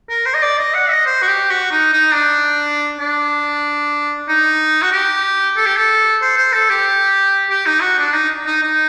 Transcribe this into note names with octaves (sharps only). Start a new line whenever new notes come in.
A#4
C5
D#5
D5
D#5
F#5
D#5
C5
F#4
G4
F#4
D#4
D#4
D4
D4
D#4
F#4
G4
A4
G4
A4
C5
C5
A4
G4
G4
D#4
F#4
D4
D#4
D#4
D#4